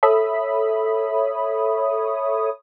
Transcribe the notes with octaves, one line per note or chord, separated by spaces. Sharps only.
A4 C#5 E5 B5 D#6